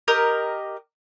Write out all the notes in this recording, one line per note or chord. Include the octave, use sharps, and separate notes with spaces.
G4 A#4 D#5